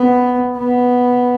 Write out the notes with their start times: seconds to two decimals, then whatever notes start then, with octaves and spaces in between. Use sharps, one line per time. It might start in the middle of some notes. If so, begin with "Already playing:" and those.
Already playing: B3
0.57 B3